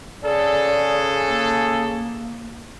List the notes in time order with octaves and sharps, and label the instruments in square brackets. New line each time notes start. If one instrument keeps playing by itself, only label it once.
[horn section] C#3 G#4 A4 [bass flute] D5
[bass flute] A#3